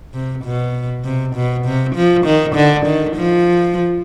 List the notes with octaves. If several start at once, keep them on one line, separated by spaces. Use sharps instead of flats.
C3
B2
C3
B2
C3
F3
D#3
D3
D#3
F3